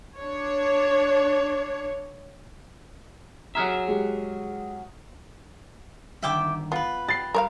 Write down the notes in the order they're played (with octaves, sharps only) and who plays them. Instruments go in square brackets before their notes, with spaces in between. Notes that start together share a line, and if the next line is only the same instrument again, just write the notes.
[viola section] D4 C#5
[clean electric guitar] F#3 G#4 E5 [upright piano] A#5 F6 F#6
[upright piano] G#3 G4
[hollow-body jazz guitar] G2 D3 D#3 [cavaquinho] E5 G5 D6
[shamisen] B3 [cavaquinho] F4 B4
[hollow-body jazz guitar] G4 [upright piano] A6 C7
[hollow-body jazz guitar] G3 [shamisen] A#4 C#5 F5